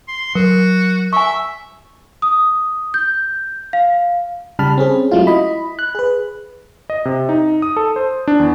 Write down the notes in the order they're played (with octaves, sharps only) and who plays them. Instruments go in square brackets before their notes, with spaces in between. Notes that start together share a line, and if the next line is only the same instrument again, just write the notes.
[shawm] C6
[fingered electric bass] F#3 [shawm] F#4 [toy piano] A#4
[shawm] E5 [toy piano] G#5 C#6
[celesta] D#6
G6
F5
[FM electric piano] C#3 G3 G4 A5 B5 F6
C4 C#4 G#4
F#3 G#3 A3 E4 F4
E4 D#5 B5
F#6
G#4 B4
[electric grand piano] D#5
C3
D#4
D#6
A4
C5
D4
E2